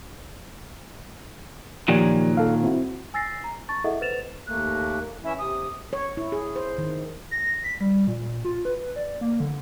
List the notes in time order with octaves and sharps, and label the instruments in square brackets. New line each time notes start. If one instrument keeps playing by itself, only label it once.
[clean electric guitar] A#2 D#3 F#3 [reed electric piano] F3 G4 D5
[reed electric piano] A4 F5
C4 E4 F#4
[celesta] G#5 E6 A6 A#6 C7
A#5
A5 C#6 A6
E4 G#4 A4 D#5 E5 F#5
B4 C5 A6 E7 F7
[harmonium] D#2 A3 A#3 [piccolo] F#6
[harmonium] E3 C#4 E4 [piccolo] E5
[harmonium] C3 [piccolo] D#6
[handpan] C#5
E4
G#4
C5
D#3
[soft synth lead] A#6
B6
G3
A#2
F4
B4
D5
A#3
D3